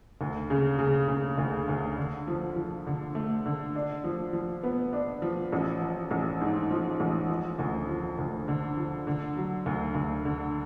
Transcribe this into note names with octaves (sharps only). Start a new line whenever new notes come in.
D2
C#3
C#3
C#3
D2
D2
D3
F3
F3
D3
A3
D3
D4
F3
F3
B3
D4
F3
A1
F3
A1
G#2
F3
A1
F3
D2
F3
D2
D3
F3
D3
F#3
D2
D2
D3